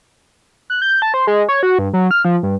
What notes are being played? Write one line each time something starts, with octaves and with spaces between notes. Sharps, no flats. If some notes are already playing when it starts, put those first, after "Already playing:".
F#6
G6
A5
C5
G#3
C#5
F#4
G2
F#3
F6
F3
G2